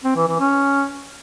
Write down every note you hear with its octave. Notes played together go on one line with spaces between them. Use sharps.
C4
E3
E3
C#4